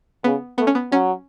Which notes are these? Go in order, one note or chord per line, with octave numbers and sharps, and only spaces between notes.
C#3 B3
A3 B3
C#4
B3
F#3 C#4